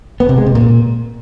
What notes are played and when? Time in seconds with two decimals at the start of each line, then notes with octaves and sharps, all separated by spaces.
0.20 B3
0.29 C3
0.38 G#3
0.46 C3
0.55 A#2